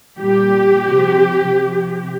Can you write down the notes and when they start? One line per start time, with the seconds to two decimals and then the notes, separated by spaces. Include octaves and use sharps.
0.19 A#2 G3 G4
0.90 C3 F3
1.60 C3 F3